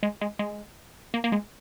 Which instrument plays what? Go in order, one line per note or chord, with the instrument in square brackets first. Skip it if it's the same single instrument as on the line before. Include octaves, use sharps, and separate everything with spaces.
[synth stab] G#3
G#3
G#3
A#3
A#3
G#3